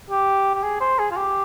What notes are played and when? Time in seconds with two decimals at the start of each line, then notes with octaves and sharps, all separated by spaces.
0.10 G4
0.55 G4
0.63 G#4
0.80 C5
0.99 G#4
1.11 F4
1.17 G4